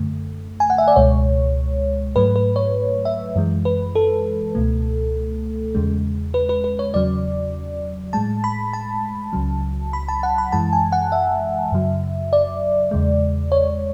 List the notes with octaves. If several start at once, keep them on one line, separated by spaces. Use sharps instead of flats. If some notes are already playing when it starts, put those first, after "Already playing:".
Already playing: F#2 D3 A3
G#5
F#5
E5
D5
C#2 B2 G#3 C#5
G#2 F#3 A3 B4
B4
C#5
E5
F#2 E3 G#3
B4
A4
C#2 B2 A3
E2 C#3 G#3
B4
B4
B4
C#5
E2 C#3 F#3 D5
A2 G#3 A5
B5
A5
C#2 C#3 F#3
B5
A5
F#5
B5
F#2 E3 G#3 A5
G#5
F#5
E5
F#2 C#3 F#3
D5
E2 C#3 G#3
C#5